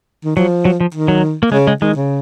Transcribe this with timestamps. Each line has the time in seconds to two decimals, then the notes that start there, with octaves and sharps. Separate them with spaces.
0.25 D#3
0.37 F3 F#3
0.65 F#3
0.80 F3
0.94 D#3
1.08 F#3
1.43 A#3
1.52 C#3 G#3
1.67 G#3
1.82 D#3 G#3
1.96 C#3